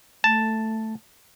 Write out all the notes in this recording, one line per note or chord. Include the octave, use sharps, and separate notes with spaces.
A3 A5